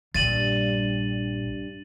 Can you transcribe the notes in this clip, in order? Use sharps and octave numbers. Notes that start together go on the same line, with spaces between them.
A#1 G2 G3 A6 D#7 F#7